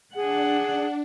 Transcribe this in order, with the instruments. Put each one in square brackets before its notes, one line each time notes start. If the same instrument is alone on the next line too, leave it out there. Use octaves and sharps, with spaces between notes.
[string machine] D4 [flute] G#4 [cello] F#5